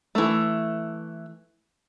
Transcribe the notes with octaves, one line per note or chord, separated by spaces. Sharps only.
E3 A3